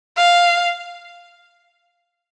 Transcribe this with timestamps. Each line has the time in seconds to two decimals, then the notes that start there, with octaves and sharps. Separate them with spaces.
0.17 F5